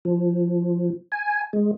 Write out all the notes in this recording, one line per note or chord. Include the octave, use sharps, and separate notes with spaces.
F3
G#5
G#3